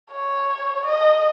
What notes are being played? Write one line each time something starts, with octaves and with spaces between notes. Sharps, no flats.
C#5
D#5